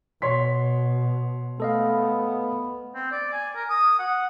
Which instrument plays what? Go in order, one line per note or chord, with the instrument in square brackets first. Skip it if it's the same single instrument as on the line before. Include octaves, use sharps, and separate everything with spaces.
[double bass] B2 [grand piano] C#5 C6 B6
[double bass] A3 [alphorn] B3 [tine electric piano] A4 D#5 F5
[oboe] C4
D5
G#5
A#4
D#6
F#5